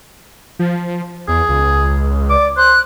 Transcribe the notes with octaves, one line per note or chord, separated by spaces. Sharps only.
F3
E2 G#4
C#2
D5 D6
C5 F#6